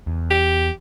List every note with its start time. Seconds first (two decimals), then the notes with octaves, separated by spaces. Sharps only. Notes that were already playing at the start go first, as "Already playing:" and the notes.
0.07 E2
0.30 G4